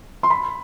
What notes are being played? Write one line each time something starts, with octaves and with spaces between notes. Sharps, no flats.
C6
B5